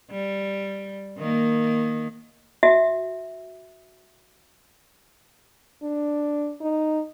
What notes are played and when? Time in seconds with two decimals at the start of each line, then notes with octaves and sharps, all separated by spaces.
0.11 G3
1.18 D#3 A#3
2.63 F#4 E5
5.83 D4
6.61 D#4